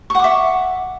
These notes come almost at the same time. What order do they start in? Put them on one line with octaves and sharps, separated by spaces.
C#6 F#5 D6 E5